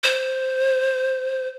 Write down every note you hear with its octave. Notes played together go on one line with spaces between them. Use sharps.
C5